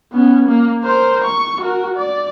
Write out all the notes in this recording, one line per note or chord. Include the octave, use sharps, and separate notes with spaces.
B3 C#4
A#3
A#4 C5
C#6
F#4 A#4
D5